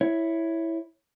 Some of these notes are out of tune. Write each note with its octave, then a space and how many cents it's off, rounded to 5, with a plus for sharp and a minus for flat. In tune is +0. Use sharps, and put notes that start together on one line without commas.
E4 +0 C#5 +0